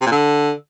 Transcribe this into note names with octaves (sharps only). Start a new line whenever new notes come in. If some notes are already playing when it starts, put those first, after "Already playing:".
C3
A#2
D3